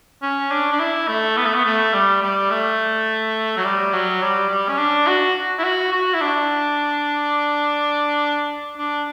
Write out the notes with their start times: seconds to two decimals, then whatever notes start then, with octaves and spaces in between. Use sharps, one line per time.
0.23 C#4
0.51 D4
0.72 D4
0.80 E4
1.08 A3
1.37 B3
1.46 A3
1.54 B3
1.65 A3
1.94 G3
2.22 G3
2.51 A3
3.57 F#3
3.65 G3
3.93 F#3
4.22 G3
4.50 G3
4.69 C#4
4.79 D4
5.07 F#4
5.59 E4
5.64 F#4
5.93 F#4
6.14 E4
6.21 D4
8.77 D4